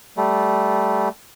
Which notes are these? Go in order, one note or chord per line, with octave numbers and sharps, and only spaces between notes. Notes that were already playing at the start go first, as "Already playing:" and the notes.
G3 A3